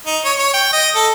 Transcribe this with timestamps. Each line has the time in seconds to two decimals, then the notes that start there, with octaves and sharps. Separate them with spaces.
0.06 D#4
0.25 C#5
0.39 C#5
0.54 G5
0.73 D#5
0.95 A4